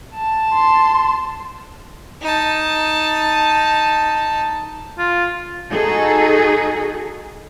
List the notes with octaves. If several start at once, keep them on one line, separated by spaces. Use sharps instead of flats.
A5
C6
D#4 A5
F4
D#4 F#4 G#4 A4